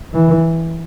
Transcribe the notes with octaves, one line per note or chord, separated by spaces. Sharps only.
E3